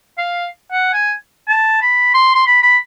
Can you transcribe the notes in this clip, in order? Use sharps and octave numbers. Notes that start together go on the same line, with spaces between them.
F5
F#5
G#5
A5
B5
C6
C6
B5
B5